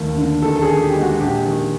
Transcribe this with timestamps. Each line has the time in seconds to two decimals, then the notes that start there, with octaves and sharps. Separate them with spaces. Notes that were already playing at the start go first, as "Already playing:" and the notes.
Already playing: D#2 A3 A#4
0.17 D3
0.42 D#3 A4
0.56 A4
0.62 G#4
0.68 D#3
0.82 G4
0.94 G#3
1.01 F#4
1.20 A#1 G4
1.46 D#3